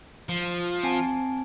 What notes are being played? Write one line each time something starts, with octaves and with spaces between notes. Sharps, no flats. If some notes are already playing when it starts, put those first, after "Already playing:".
F3
C4 G#5 A5